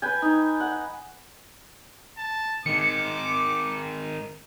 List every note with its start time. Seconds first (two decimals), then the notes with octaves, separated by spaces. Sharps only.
0.02 B4 G5 G#5
0.22 D#4
0.60 F#5
2.18 A5
2.66 D#3 G#3 D6 C#7